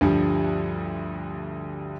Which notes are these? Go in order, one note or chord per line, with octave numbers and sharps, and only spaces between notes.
D2 G2 F3 G3